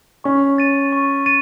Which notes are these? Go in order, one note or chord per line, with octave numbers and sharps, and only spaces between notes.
C#4 C#6
A6 D#7
C#6
A6 D#7